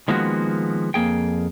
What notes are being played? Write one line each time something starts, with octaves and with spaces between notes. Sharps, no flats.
D#3 F3 G#3 A#3 B3 F#4
F2 A#3 G#4 G5